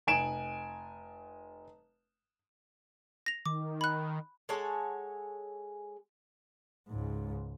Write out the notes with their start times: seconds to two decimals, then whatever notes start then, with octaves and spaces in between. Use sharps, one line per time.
0.07 F1 G#5 D7 E7
3.26 A#6 F7
3.46 D#3 D6
3.81 B5 F#6
4.49 G#3 A4 C#5 F#5
6.88 C#2 G#2